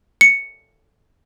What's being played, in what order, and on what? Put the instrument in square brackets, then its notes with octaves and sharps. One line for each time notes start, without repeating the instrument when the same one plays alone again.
[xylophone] C#7